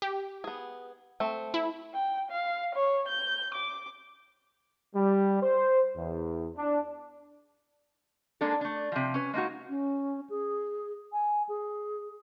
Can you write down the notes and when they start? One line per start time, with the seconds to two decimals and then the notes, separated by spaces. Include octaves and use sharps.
0.02 G4
0.44 B3 G#4
1.20 A3 C4
1.54 E4
1.94 G5
2.31 F5
2.75 C#5
3.09 G6
3.54 D6
4.95 G3
5.42 C5
5.97 E2
6.57 D4
8.41 G#3 A#3 D4 A4
8.61 A3 D4
8.92 C3 F3
9.14 C#4 B4
9.34 G#3 A#3 D#4 F#4
9.69 C#4
10.30 G#4
11.12 G#5
11.49 G#4